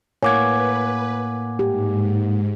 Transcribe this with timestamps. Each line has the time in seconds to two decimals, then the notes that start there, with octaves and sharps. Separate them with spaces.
0.23 A2 A#3 B4 C#5 F#5 G#5 D6 G#6
1.59 G#2 G4